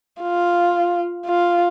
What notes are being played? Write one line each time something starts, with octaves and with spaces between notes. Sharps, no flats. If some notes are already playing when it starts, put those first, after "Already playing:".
F4
F4